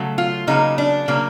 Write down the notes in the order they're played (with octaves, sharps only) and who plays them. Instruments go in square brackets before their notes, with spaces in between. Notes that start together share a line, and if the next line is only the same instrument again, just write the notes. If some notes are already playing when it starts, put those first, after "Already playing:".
Already playing: [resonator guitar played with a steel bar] C#3 F#3 A3
F4
C#3 F#3 A#3 D#4
D4
C#3 F#3 A#3